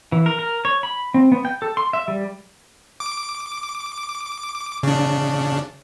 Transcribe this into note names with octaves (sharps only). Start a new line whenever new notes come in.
E3
A#4
A#4
C#5
B5
C4
B3
G5
A4
C6
E5
G3
D6
C#3 D4